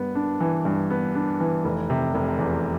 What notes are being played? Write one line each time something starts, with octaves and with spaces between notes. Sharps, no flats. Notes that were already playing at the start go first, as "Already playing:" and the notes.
Already playing: G2 B3
D4
E3
G2
B3
D4
E3
F1
C3
F1
E2